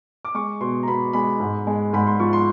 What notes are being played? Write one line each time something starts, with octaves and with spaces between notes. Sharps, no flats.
D6
G#3 C#6
B2 C6
A#5
B2 B5
G#3 B5
G#2
G#3
G#2 B5
C6
F3 C#6
C6